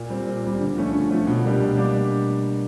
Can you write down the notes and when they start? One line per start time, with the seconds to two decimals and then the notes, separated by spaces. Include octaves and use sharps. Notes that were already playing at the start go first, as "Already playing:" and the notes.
Already playing: A#2
0.10 G3 C4
0.26 A#2
0.44 G3 C4
0.60 D3
0.76 F3 A3 C#4
0.94 D3
1.09 F3 A3 C#4
1.27 B2
1.44 G3 A#3 D4 G4
1.61 B2
1.77 G3 A#3 D4 G4